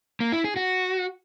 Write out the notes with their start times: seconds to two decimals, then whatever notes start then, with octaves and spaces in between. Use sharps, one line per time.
0.20 A#3
0.32 E4
0.44 G#4
0.56 F#4